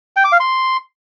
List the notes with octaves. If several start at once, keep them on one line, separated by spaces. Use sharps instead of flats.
G5
D6
F5
C6